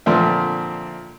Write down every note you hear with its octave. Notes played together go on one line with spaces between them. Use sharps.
A#2 D3 F3 C4 D4 E5